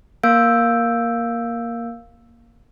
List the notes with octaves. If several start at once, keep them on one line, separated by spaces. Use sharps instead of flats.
A#3 A#4 F5 E6 G6 D7